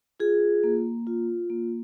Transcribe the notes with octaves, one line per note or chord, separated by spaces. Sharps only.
F4 G#4
A#3
F4
A#3